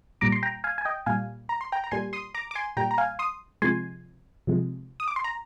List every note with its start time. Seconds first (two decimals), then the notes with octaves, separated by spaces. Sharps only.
0.21 A#2 G3 A#5 D6
0.32 C6
0.43 G5 A#5
0.64 F5 G#5
0.78 G#5
0.85 D#5 G5
1.06 A#2 G3 F5 G#5
1.49 A#5
1.61 C6
1.72 G5 A#5
1.84 A#5
1.91 A#2 G3 G#5 C6
2.13 C6 D#6
2.35 A#5 D6
2.51 D6
2.56 G#5 C6
2.77 A#2 G3 G5 A#5
2.91 A#5
2.98 F5 G#5
3.19 C6 D#6
3.62 C3 F3 G#3 G#5 C6
4.47 C3 F3 G#3
5.00 D#6
5.08 D6
5.16 C6
5.24 A#5